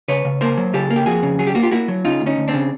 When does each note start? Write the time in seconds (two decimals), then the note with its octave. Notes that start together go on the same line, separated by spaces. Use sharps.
0.08 C#3 B4 C#5
0.25 C#3
0.41 A#3 A#4 C5
0.57 F#3
0.73 C#3 G4 A4
0.90 A#3
0.96 G4
1.06 F2 F#4 G#4
1.23 C#3
1.39 F#3 G#4
1.47 G4
1.55 A#3 F#4
1.63 F4 G4
1.71 A#3 E4 F#4
1.88 F#3
2.05 C#3 D#4 F4
2.21 D2
2.26 C#4 D#4
2.37 D2
2.48 C4 D4
2.54 C#3